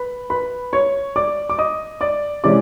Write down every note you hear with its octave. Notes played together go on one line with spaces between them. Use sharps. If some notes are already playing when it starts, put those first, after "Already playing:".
Already playing: B4 B5
B4 B5
C#5 C#6
D5 D6
D6
D#5 D#6
D5 D6
C3 E3 G#3 C#4 D5 D6